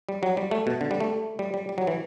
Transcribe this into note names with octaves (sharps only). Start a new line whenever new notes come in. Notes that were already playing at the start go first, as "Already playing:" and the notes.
G3
F#3
G3
A3
B2
D3
G3
A3
G3
G3
G3
F#3
E3